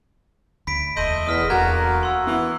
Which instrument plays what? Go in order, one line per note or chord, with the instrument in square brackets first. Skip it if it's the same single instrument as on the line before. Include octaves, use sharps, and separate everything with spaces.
[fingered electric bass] D2 [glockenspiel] B5 B6 D7
[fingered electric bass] E1 [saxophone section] A3 D#5 [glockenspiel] C6 G6 D#7
[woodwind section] E2 [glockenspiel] D#6 F6 B6
[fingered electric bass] D1 E2 [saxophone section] D3 A#3 [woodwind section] F#4 [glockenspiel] A#5 F#6 G#6
[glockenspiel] C6 E6
[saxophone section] E3 [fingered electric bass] B3